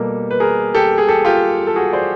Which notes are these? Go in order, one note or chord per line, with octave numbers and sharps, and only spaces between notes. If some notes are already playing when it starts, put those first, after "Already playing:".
Already playing: B2 G3 A#3 G4 A4
B4
G#4 A#4
G4 A4
G#4
G4 A4
F4 G4
A4
F#4 G#4
C5 D5